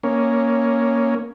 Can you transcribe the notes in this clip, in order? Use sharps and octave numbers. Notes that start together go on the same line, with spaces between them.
A#3 C#4